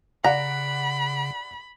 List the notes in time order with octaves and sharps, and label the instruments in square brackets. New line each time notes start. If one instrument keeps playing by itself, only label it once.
[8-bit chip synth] C#3 [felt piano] D5 F#5 [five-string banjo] A#5 [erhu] B5